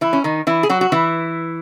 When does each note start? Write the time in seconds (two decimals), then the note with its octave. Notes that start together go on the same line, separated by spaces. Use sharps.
0.01 E3 E4
0.13 C#4
0.24 D#3 D#4
0.47 E3 E4
0.63 G#4
0.69 F#3 F#4
0.81 F#4
0.92 E3 E4